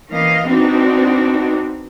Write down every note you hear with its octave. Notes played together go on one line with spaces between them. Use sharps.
E3 A#3 C#4 D#5 F5
B3 C4 D4 D#4 F#4